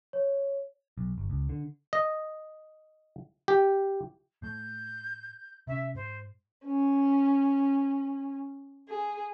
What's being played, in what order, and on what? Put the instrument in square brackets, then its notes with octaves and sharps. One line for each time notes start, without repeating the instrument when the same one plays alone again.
[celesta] C#5
[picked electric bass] B1
G1
C#2
D3
[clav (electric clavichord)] D#5
G4
[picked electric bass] A2 A3 [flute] G6
[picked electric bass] C3 C#4 [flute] E5
[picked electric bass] G#2 [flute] C5
[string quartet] C#4
G#4